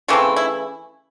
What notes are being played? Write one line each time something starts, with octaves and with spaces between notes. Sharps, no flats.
C#3 E3 A3 C4 F4
E4